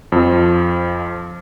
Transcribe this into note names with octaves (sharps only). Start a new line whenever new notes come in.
F2 F3